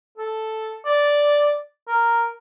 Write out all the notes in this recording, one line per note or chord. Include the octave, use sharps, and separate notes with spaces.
A4
D5
A#4